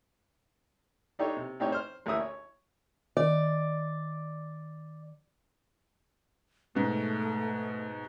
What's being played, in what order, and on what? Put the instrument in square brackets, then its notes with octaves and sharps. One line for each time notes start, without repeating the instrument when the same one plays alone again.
[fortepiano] D4 D#4 G4 A4 C#5
C3
A2 C4 D#4 G4 C#5
C5 F6
A1 D2 A#3 E4 E5 D#6
C#5
[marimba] D#3 [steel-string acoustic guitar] D5
[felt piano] G#2 B2 [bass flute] A3